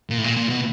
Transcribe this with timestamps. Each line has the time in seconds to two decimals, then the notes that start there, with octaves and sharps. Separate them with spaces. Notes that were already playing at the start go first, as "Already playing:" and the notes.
0.10 A#2
0.18 A2
0.24 A#2
0.37 A#2
0.50 B2